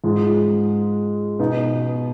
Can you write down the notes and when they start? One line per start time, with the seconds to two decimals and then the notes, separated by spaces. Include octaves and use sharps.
0.04 G#2 F3 G#3
1.39 B2 B3 D#4